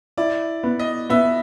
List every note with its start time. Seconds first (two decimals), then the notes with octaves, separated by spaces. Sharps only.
0.17 E4 D5
0.63 B3
0.79 D#5
1.10 B3 E5